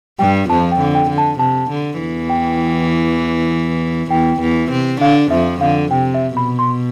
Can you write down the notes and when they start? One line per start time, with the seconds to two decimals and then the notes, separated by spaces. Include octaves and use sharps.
0.19 G2 G3 G5
0.49 F2 F3 A5
0.72 G5
0.80 D3
0.95 G5
1.10 D3
1.18 A5
1.39 C3 A5
1.70 D3
1.99 E2 E3
2.30 G5
4.11 E2 E3 G5
4.41 E2 E3
4.71 C3 C4
5.01 D3 D4 F5
5.31 F2 F3 E5
5.61 D3 F5
5.91 C3 G5
6.14 E5
6.36 B2 B5
6.59 C6